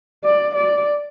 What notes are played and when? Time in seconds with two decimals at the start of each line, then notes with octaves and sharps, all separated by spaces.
0.25 D5
0.55 D5